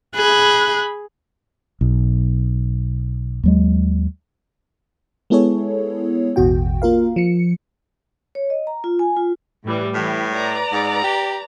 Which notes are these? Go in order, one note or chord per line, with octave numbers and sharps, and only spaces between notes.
G#4 B5 F#6
B1
D#2 F#3 G#3
G#3 B3 E4 G#4 A4 C#5
A1 E2 B2 F#4 G5
A#3 F4 A#4 F5
F3 C#7
C#5
D#5
A#5
F4
G#5
F4
A2 E3 G3
A2 E3 G4
B4 D5 A#5
G#2
G4